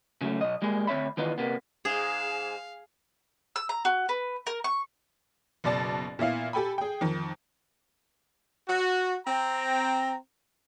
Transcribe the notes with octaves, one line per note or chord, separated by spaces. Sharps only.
C#3 F#3 A3
B1 D#5
G3 G#3 A#3 G#4
D2 C4 C#5 E5 B5
D#3 E3 B3 D#4 F4
C3 A#3 B3
G#2 G#3 G#4 F5 E7
E6
A#5
F#4
B4
A#4
C#6
F#1 B2 D5 A5 A6
A#2 B3 E4 F5
G4 A4 G5 G#5 B5
G#4 G5
F2 D#3
F#4
C4 A#5